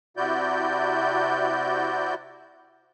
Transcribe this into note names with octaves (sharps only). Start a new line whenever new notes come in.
C3 E4 F#4 D5 G6